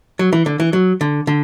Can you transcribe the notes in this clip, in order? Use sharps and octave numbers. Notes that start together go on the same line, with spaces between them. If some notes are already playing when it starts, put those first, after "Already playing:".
F#3
E3
D3
E3
F#3
D3
D3